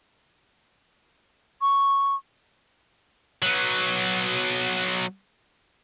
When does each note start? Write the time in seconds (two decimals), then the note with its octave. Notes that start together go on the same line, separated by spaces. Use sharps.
1.62 C#6
3.43 F#3 B3